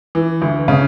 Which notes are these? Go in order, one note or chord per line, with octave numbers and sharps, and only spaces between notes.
E3
D2
C#3